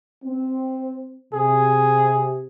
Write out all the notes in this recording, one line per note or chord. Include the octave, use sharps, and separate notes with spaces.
C4
C3 G#4